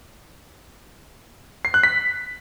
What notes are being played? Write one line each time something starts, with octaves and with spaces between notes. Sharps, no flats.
C7
F#6
B6